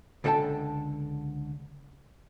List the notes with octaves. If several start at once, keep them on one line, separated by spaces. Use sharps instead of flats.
C#2 D3 A4 D#5 G5 A5